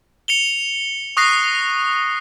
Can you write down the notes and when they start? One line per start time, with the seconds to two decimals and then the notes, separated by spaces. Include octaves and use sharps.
0.28 C#7 F7 G7
1.17 C#6 D#6 F#6 A#6 C7